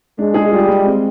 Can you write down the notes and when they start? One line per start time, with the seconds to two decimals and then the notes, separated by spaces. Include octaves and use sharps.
0.19 G#3 D4
0.34 G#4
0.51 G3 F4
0.68 G#3
0.86 C4